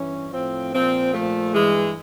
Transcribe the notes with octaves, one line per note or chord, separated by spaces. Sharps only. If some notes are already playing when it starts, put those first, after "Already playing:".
Already playing: G2 E3 C#4
A2 F3 C4
A#2 F3 C4
A#2 F3 A3
G2 E3 G#3